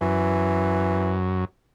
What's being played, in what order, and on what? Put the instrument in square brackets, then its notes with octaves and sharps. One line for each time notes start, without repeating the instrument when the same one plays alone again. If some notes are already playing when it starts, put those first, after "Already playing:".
[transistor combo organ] F#2 [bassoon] E3